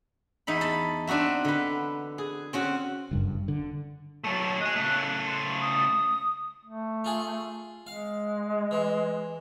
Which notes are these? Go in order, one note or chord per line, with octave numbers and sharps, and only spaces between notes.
E2 D#4 E5 B5
A5 B5
C4 D4 D#4 F#4 E5
D3 B4
G#4
C4 C#4 F#4
F#1 G2
D3
F#3 A3 A5
D#5 G#5 F#6
C#3 A3
C6
D#6
A3
F4 G#4
G#3 F5
E3